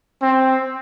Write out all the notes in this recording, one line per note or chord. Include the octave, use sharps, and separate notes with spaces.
C4